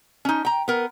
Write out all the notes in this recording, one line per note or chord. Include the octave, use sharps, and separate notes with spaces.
C#4 D#4
G5 A#5
B3 A#4